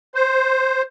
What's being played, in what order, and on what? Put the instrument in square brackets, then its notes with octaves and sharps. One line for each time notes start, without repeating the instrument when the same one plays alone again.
[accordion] C5